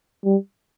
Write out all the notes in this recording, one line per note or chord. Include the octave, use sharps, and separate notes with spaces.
G3